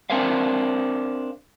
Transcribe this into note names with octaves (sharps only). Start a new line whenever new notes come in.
C4 D4 A#4 C5 E5 F5